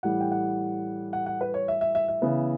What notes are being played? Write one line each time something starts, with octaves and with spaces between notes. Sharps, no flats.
A2 E3 G3 F#5
G5
F#5
F#5
F#5
B4
C#5
E5
E5
E5
E5
C#3 E3 B3